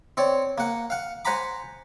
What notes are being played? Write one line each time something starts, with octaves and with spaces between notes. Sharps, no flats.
C4 C#5 D5
A#3 F#5
F5 F#5
C5 F#5 G#5 A#5 B5 D6